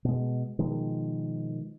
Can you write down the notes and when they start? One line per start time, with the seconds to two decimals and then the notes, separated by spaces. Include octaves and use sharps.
0.05 B2 G#3
0.59 B2 D#3 F3 G#3